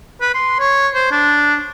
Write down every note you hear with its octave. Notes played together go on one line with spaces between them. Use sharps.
B4
C6
C#5
C5
D4